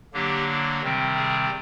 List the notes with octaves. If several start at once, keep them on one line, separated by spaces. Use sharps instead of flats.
D3 F#3 A#3 D4 G4
C3 D#3 G3 C4
G#4